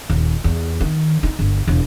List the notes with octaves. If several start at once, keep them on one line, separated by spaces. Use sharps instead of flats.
D#1
E2
D#3
D#4
G1
E1